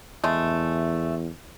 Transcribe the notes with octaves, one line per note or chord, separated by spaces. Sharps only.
E2 G#3 A3